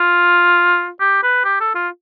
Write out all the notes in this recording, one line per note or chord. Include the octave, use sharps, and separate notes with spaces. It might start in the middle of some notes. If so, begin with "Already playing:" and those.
Already playing: F4
G4
B4
G4
A4
F4